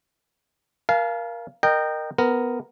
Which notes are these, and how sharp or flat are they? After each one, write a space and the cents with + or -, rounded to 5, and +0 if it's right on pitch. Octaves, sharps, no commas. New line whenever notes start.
A#4 +20 F5 -15 A5 -45
A#4 +0 D#5 -20 G5 -5
B3 +10 A#4 +0